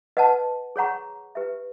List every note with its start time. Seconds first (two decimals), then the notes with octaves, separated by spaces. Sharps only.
0.17 B4 D#5 F#5 A5
0.76 G#4 C#5 F#5 A#5 C#6
1.35 G4 B4 E5